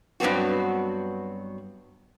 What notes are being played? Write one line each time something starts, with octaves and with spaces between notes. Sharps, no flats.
G2 F#3 B3 C4 F#4